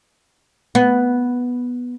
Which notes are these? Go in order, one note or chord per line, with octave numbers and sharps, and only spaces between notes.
B3